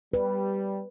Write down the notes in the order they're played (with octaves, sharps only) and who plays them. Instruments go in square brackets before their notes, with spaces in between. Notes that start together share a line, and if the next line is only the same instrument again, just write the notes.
[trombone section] G3 [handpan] B4